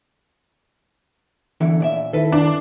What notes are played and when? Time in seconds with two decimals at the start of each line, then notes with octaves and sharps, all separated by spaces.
1.61 E2 D3 E3
1.80 A#2 D5 E5
2.13 D#3 E4 A4 B4
2.32 D4